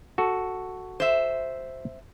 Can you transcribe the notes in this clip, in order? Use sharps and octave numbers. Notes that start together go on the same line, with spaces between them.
F#4 A4
C5 E5